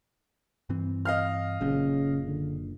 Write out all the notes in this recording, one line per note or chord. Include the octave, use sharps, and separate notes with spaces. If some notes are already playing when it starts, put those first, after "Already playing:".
G2 E3 C4
D#5 F5 F6
F#1 F#2 A#2 C#3
D3